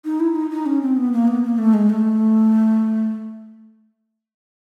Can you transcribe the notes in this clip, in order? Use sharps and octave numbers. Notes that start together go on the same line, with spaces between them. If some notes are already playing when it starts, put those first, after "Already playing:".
D#4
E4
D#4
D#4
C#4
C4
B3
A#3
B3
A#3
A3
G#3
A3